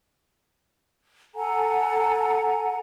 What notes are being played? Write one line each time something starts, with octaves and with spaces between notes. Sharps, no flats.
A4 F#5 G#5 A#5